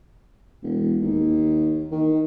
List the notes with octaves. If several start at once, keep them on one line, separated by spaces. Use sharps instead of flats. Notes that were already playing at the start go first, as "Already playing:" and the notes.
E1
D#2
D#3